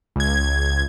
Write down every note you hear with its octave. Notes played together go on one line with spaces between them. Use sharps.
C#2 G#6